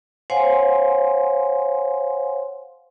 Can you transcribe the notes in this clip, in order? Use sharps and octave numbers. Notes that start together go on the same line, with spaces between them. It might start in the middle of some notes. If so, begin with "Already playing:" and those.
C5 C#5 F5 F#5 G#5 C6